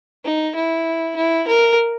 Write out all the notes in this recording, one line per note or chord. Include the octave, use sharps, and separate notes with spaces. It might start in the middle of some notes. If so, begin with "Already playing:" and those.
D#4
E4
E4
A#4